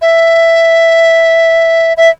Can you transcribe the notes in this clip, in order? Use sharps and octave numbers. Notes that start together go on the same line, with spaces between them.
E5
E5